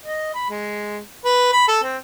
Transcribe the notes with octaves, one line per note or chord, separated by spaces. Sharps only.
D#5
B5
G#3
B4
B5
A4
C4